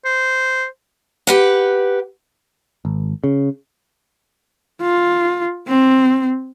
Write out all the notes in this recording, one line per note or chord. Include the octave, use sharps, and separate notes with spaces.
C5
G4 B4 F#5
G#1
C#3
F4
C4